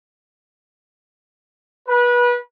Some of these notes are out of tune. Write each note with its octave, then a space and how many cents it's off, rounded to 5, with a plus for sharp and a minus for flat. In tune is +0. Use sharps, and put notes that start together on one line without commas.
B4 -25